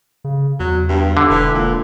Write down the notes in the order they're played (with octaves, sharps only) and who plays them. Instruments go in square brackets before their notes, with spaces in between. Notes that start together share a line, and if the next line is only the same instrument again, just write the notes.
[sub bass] C#3
[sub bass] E2 [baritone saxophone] F#3
[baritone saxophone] G2
[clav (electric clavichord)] D3
[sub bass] E1 [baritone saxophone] E3
[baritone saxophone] A#2